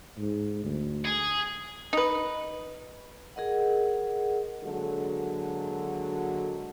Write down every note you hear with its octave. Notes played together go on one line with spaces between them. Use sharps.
G#2
D2
G#4
D#4 B4
G#4 A#4 D#5 F#5
D3 F#3 G#3 A#3 F#4 A4